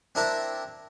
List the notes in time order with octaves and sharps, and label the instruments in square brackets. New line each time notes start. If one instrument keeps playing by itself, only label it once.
[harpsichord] C4 D4 E4 A#4 A5 A#5